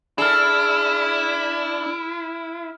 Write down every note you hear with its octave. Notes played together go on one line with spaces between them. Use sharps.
D4 E4 G#4 A4 B5 F6